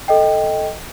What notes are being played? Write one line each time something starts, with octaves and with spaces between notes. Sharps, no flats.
A4 D#5 G5